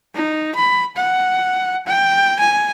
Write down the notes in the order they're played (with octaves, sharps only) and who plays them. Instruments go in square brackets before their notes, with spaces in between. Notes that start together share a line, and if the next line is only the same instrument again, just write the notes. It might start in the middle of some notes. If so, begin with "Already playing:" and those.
[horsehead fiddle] D#4
B5
F#5
G5
G#5